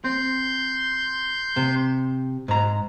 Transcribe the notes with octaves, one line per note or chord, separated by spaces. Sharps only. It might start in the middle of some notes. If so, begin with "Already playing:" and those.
C4 C6 G6
C3
G#2 A#5